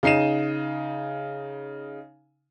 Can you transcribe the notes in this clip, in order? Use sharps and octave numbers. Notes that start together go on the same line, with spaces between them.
C#3 D#4 C7 D#7 E7